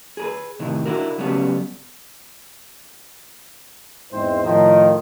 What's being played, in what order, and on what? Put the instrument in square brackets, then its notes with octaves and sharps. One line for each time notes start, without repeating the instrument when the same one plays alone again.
[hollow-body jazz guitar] G#4 A#4 B4
A2 C3 D#3 E3
D4 E4 F#4 A#4
C#3 F#3 G3 A3 B3 C#4
[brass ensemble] E2 G#2 G#3 C4 E4 C5
A2 D#3 F3